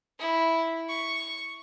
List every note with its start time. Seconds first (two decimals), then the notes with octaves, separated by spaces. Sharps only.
0.19 E4
0.89 C#6